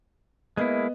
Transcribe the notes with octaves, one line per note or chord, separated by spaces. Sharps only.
G#3 A#3 B3 E4 D#5